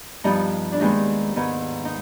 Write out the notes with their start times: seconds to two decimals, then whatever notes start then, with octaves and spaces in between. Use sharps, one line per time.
0.24 G2 F3 B3 D#4
0.72 D4
0.80 D#2 D#3 G#3 B3 D#4
1.36 G#2 D#3 G#3 B3
1.85 D#4